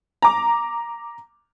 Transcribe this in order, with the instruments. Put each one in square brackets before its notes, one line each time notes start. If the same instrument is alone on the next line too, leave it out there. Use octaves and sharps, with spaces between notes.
[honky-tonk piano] A#5 D6